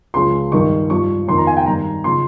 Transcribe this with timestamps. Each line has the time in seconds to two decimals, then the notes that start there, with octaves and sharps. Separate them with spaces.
0.14 C#2 C#3 F3 C6
0.52 G2 D#3 C#6
0.90 G2 F3 C#6
1.28 F2 D#3 C6
1.38 A#5
1.47 G#5
1.57 G5
1.66 G2 D#3 A#5
2.04 C#3 F3 C6